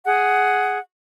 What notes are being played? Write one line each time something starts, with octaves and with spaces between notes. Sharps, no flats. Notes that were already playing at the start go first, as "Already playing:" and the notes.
G#4 F#5